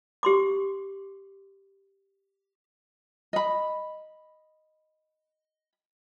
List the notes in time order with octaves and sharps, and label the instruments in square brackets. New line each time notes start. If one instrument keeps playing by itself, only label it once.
[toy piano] G4 C6 D6
[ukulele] D#5 B5